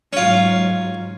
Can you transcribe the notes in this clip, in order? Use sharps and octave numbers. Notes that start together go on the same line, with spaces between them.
G#2 F#3 C#4 F4